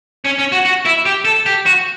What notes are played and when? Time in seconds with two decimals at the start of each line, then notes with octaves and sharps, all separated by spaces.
0.25 C#4
0.39 C#4
0.52 F#4
0.65 F#4
0.85 E4
1.05 G4
1.25 A4
1.46 G4
1.66 F#4